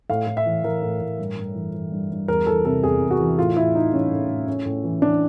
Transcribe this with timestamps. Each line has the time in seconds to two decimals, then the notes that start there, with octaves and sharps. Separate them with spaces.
0.10 A2 F5
0.27 A2
0.37 E5
0.46 E3
0.63 E3 A#4
0.82 A2
1.00 A2
1.19 G2
1.37 G2
1.55 E3
1.73 E3
1.92 G2
2.11 G2
2.28 E2 A#4
2.46 E3 A4
2.65 C3 A4
2.83 E2 G#4
3.01 E2
3.11 F#4
3.19 E3
3.38 A2 F4
3.56 A2 E4
3.74 E3 D#4
3.92 E3 C#4
4.11 A2
4.29 A2
4.47 A2 C#4
4.65 A2
4.84 E3
5.02 E3 D4